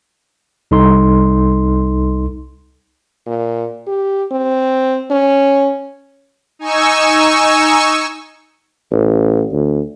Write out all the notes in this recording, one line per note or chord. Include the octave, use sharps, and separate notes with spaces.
C2 D#4 A4 C6
A#2
G4
C4
C#4
D#4 G#5 C#6 E6
A1
D2